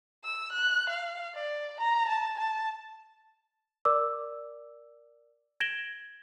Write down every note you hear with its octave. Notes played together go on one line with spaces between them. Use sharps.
E6
F#6
F5
D5
A#5
A5
A5
A#4 D5 D6 E6
G#6 A#6 D7 E7 F#7 G7